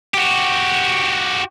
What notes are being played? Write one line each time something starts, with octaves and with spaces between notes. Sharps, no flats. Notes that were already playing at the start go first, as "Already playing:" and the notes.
F#4 G4